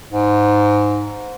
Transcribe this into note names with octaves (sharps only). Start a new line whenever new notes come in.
G#2